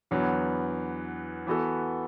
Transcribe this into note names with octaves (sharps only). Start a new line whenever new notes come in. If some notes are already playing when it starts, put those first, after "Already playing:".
E2 D3 F#3 B3
E3 B3 F#4 A4